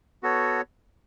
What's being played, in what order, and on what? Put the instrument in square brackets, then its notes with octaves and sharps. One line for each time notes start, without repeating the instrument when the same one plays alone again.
[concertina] B3 F#4 A4 C#5